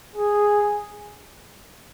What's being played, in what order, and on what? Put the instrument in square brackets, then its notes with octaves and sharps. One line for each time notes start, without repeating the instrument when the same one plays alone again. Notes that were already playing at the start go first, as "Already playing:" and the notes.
[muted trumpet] G#4